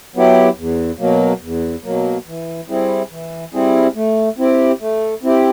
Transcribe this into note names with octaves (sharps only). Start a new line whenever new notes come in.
F#3 B3 E4 G4
E2
B2 F#3 A#3
E2
B2 F#3 A#3
E3
G3 C4 E4 G#4
E3
G3 C4 E4 G#4
A3
C4 E4 G4
A3
C4 E4 G4